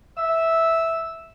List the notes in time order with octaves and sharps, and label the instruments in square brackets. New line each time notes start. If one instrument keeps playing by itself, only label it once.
[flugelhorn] E5 [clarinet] E6